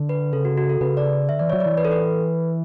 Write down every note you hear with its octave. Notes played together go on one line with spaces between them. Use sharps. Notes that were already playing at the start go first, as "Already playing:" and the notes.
Already playing: D3
B4
C#3 A4
F#4
F#4
A4
C#3 B4
D5
D3 E5
E3 D5
F#3 C#5
D5
E3
B4
A4
B4